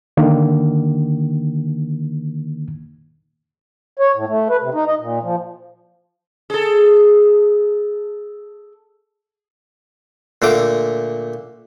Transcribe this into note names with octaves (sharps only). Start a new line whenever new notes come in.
D3 D#3 A#3
C#5
A2
A3
B4
C3
D#4
D#5
A#2
F3
G#4 A4
A#2 D3 A3 D6